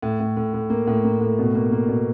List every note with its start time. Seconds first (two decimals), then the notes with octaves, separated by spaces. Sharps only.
0.02 A2
0.20 A2
0.37 A2
0.54 A2
0.70 A#3
0.87 A2
1.04 A#3
1.21 A2
1.39 B2
1.55 A#3
1.72 A#3
1.89 B2